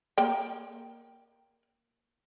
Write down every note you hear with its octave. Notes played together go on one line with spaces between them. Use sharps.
A#3 G5